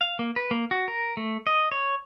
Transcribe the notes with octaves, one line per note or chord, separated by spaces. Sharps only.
F5
A#3
B4
A#3
F#4
A#4
A3
D#5
C#5